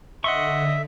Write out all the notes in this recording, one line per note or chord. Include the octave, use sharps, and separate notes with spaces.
D3 D#5 E5 F#5 C6 C#6